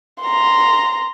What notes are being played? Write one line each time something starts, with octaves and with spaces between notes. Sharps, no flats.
A#5 C6